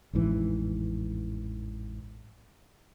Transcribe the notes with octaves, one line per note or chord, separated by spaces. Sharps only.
A1 F2 G#2 E3